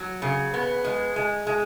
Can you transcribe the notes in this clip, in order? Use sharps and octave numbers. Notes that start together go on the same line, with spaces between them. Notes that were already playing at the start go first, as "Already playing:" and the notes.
Already playing: F#3
C#3
B3
G#3
G#3
G#3